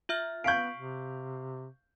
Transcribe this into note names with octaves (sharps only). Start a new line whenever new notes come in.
F4 E5 F6
B3 F5 C#6 G6 B6 D7
C3